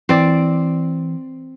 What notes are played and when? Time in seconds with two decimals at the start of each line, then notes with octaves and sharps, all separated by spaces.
0.09 E3 C4 D5